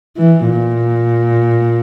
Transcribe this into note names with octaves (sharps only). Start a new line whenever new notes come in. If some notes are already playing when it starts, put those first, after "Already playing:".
E3
A#2